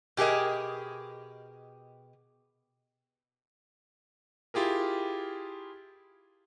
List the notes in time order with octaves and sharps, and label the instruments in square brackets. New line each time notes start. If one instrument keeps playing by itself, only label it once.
[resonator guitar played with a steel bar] B2 G4 G#4 A#4 D#5
[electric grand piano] E4 F4 G4 G#4 A#4